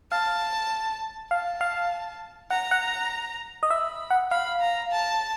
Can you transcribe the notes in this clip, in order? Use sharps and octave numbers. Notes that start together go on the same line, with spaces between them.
F5 A5
F5 A5
F5
F#5 A#5
F#5
D#5
E5 B5
F#5
F5 B5
A#5
A5